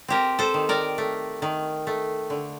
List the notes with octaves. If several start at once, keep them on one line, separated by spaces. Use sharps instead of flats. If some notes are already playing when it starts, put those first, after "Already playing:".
C4 G4 A#4
A4 C5
D#3
A#4 D5
A3
D#3
A3
D3